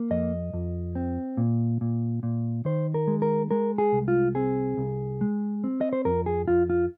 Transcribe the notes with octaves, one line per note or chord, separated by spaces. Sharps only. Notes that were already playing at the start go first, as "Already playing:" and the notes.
Already playing: A#3
F2 D#5
F2
C4
A#2
A#2
A#2
D#3 C5
A#4
G#3
A#4
G#3 A#4
G#4
C2
F4
C4 G#4
C2
G#3
C4
D#5
C5
F2 A#4
G#4
F2 F4
F4